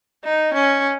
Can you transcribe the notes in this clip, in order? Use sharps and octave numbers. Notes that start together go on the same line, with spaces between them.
D#4
C#4